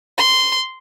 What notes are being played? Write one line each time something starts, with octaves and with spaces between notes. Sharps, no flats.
C6